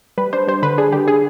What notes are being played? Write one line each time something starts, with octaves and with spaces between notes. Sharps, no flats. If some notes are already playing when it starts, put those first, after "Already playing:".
G3 B4
D4 C5
G3 C5
D3 B4
D4 G#4
D3 G4
D3 G#4